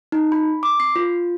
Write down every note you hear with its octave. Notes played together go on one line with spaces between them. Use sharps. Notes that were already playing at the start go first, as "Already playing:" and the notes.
D#4
B5
D6
C7
F4